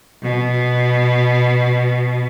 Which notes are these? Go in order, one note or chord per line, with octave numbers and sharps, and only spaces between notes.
B2